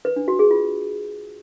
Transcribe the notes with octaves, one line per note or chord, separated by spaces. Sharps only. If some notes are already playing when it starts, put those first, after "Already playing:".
B4
D4
F#4
G#4
F4